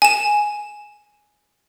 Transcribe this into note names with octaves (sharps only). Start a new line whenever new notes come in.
G#5 E7